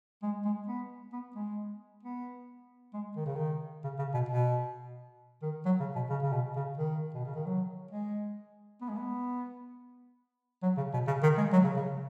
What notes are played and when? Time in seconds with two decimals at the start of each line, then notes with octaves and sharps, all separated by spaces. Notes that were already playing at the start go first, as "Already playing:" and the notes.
0.23 G#3
0.45 G#3
0.68 B3
1.13 B3
1.36 G#3
2.03 B3
2.94 G#3
3.17 D#3
3.26 C#3
3.36 D#3
3.84 C#3
3.99 C#3
4.14 B2
4.29 B2
5.43 D#3
5.66 F#3
5.80 C#3
5.96 B2
6.10 C#3
6.22 C#3
6.33 B2
6.56 C#3
6.78 D#3
7.14 B2
7.25 C#3
7.35 D#3
7.46 F#3
7.91 G#3
8.82 B3
8.89 G#3
8.97 B3
10.63 F#3
10.78 C#3
10.94 B2
11.07 C#3
11.23 D#3
11.38 G#3
11.53 F#3
11.64 C#3
11.76 C#3